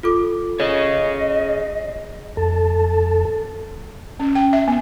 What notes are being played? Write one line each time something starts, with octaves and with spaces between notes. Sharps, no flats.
F4 A4 D6
G#4 C#5 D#5
F2 A4 A5
C#4
G5
E5
B3